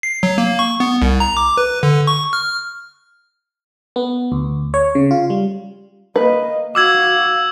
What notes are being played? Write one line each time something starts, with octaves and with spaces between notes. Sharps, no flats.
C7
F#3
A#3
C#6
B3
C2
A#5
D6
B4
D3
C#6
F6
B3
D2
C#5
C#3
F4
G3
A#3 B4 D#5
F#4 F5 D6 E6 G#6